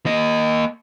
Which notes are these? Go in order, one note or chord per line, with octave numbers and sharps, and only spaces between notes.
A#3 D#5